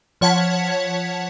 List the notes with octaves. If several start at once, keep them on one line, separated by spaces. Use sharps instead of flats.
F3 C#5 F#5 A5 G#6 B6